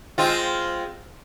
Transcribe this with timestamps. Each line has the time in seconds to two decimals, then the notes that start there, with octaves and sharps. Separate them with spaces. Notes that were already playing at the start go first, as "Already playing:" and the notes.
0.18 G#3 C4 F4